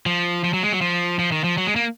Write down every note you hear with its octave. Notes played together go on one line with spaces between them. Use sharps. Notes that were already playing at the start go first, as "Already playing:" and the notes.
F3
F3
F#3
G#3
F#3
F3
F3
D#3
F3
F#3
G#3
A#3